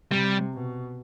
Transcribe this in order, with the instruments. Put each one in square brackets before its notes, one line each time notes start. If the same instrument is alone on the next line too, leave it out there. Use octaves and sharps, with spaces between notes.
[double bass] C3 [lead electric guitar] G3
[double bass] B2